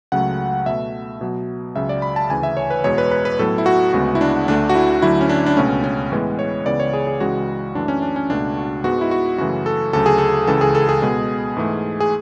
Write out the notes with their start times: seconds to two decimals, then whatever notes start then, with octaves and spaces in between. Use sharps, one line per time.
0.12 C#2 C#3 F#3 A3 F#5
0.66 B2 A3 E5
1.21 B2 F#3 B3
1.75 C#2 C#3 F#3 E5
1.89 D5
2.02 B5
2.16 A5
2.30 D2 C#3 E3 G#5
2.43 E5
2.57 C#5
2.70 B4
2.84 E2 B2 G#3 C#5
2.98 B4
3.11 B4
3.25 B4
3.39 A2 F#3 B3 A4
3.58 E4
3.66 F#4
3.93 D2 C#3 G#3 B3 F#4
4.15 E4
4.21 D4
4.48 D2 D3 A3 D4
4.69 F#4
4.75 E4
5.02 D2 D3 F#3 E4
5.21 C#4
5.29 D4
5.46 D4
5.57 C#2 B2 A3 C#4
5.84 C#4
6.12 A2 E3 G#3 B3
6.39 C#5
6.66 C#2 C#3 E3 B3 D5
6.80 C#5
6.93 G#4
7.07 G#4
7.20 C#2 C#3 E3 G#3 F#4
7.75 F#2 E3 A3 D4
7.88 C#4
8.02 D4
8.16 C#4
8.30 C#2 B2 A3 D4
8.57 F#4
8.84 G#2 G#3 B3 F#4
9.01 E4
9.11 F#4
9.38 F#2 C#3 E3 A3 F#4
9.66 A4
9.93 D2 C#3 F#3 A4
10.06 G#4
10.18 A4
10.47 C#2 C#3 E3 A4
10.61 G#4
10.75 A4
10.89 G#4
11.02 B2 G#3 B3
11.56 G#2 E3 A3
12.00 G#4